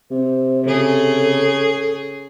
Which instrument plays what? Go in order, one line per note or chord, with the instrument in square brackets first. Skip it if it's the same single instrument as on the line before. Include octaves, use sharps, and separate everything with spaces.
[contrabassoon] C3 [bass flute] C5
[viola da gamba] C#3 G#4 [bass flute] A4